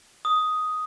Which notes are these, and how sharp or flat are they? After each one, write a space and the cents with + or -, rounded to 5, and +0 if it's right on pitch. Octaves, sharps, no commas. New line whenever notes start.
D#6 +5